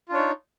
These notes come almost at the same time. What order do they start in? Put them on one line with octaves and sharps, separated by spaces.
F4 D4 C#5 D#4